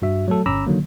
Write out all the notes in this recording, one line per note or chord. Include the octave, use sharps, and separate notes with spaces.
G2 F#4 E5
F#3 A3 A4
G1 C#4 A#5 B5 D6 E6
D3 D#3 F#3 A#3